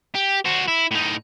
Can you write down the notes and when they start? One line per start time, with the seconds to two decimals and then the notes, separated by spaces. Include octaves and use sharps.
0.15 G4
0.45 F#4 C5
0.68 E4
0.91 A2 D#4